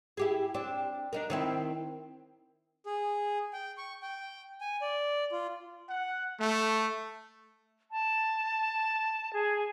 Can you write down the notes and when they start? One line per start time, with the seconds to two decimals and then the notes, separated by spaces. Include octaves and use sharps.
0.17 E4 G4 G#4
0.54 C4 D4
1.13 D4 D#4 A#4
1.30 D#3 C4 E4
2.86 G#4
3.53 G5
3.78 C#6
4.02 G5
4.61 G#5
4.81 D5
5.32 F4
5.90 F#5
6.39 A3
7.91 A5
9.33 G#4